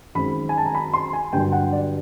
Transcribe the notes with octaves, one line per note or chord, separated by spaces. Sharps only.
F#2 D#3 G#3 C4 B5
G#5
A5
A#5
B5
C6
G#5
G2 D3 F#3 A#3 G5
F#5
D5